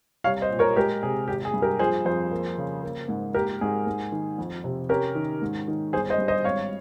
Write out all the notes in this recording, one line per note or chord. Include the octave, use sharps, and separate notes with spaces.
C2 C#5 F5
C5 D#5
A#2
A#4 C#5
G#3 G4 A#4
C3 G#4
G#1 G4
G#4
G2
G4 A#4
F3 G#4 C5
F2 G#4 C5
A#3
C#3
A#3
G#2
A#3 G4 A#4
G#2 G#4
G#2
D#3
F2
C3
C#4 G4 A#4
D#3
G#2
D#3
G1 G#4 C5
C5 D#5
G2
C5 D#5
G#1 C#5 F5